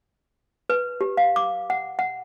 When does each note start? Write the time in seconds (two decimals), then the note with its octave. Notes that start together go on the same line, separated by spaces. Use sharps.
0.70 B4
1.01 G4
1.17 F5
1.36 D6
1.70 F#5
1.99 F#5